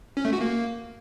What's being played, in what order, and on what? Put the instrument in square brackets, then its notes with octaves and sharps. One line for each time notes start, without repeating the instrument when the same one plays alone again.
[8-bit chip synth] C#4
A3
F#4
A#3